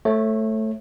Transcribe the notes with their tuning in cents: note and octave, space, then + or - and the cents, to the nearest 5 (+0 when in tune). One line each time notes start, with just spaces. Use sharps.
A3 +0 C#5 -30